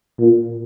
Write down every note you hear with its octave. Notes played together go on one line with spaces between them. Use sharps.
A#2